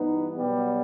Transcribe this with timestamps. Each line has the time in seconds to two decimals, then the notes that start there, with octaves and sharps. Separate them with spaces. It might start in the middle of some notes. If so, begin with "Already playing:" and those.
Already playing: G2 E3 G3 B3 D#4
0.37 B2 F#3 G3 B3